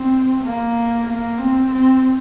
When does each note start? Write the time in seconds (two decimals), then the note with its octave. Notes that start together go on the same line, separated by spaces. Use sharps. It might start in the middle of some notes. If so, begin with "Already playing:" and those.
Already playing: C4
0.43 A#3
1.07 A#3
1.38 C4
1.70 C4